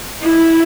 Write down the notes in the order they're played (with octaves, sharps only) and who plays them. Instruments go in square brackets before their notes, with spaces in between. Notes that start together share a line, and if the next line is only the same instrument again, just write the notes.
[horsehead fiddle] E4